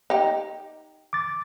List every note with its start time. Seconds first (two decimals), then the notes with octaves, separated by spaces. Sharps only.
0.10 D#4 G4
1.13 D6 A6